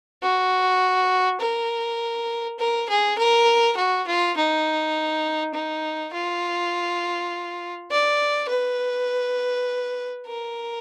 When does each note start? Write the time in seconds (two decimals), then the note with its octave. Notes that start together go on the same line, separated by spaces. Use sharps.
0.22 F#4
1.41 A#4
2.59 A#4
2.89 G#4
3.18 A#4
3.77 F#4
4.07 F4
4.37 D#4
5.54 D#4
6.13 F4
7.91 D5
8.49 B4
10.27 A#4